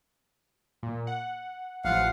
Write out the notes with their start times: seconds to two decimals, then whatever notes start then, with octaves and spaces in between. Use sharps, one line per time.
0.83 A#2
1.07 F#5
1.85 A1 F3 F4 F5 F#5